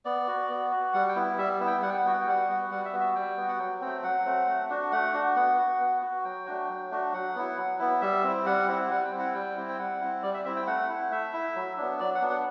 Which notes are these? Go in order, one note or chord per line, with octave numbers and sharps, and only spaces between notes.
B3 D5
F#4
B3
F#4
G3 F#5
G5
B3 E4
G3 E5
B3 E4
G5
G3 F#5
G5
F#5
B3 F#4 G5
F#5
G5
G3 F#5
B3 F#4
G3 F#5
E5
B3 F#4
E5
G3 G5
B3 F#4
F#5
F#3 G5
A3 C4 G5
F#3 F#5
A3 C4
A3
D4 F#4
A3 F#5
D4 F#4
B3 F#5
F#4
B3
F#4
F#3 G5
A3 D4 F#4
F#3
A3 D4 F#4
F#3 F#5
B3 E4
F#3
B3 E4
G3 E5
C4 E4
G3 F#5
C4 E4
G3 F#5
G5
C4 E4
F#5
G3 G5
C4 E4
G5
G3 F#5
C4 E4
G3 D5
E5
C4 E4 E5
G5
A3 F#5
E4
A3 E5
E4
F#3
B3 D4
F#3 D5
F#5
B3 D4
F#5